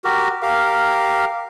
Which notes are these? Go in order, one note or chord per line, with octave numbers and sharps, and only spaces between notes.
F#4 G4 A#4
G4 A#4 F5